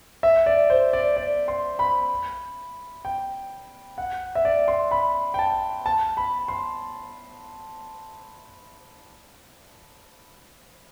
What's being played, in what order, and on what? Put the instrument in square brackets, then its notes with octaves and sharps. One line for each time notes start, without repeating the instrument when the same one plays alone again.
[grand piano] E5
D5
C5
D5
D5
C6
B5
G5
F#5
E5
D5
C6
B5
G5
A5
A5
B5
C6